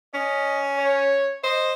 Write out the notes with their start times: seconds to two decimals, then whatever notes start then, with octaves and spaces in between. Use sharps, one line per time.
0.14 C#4 D#5
0.78 C#5
1.44 C5 D#5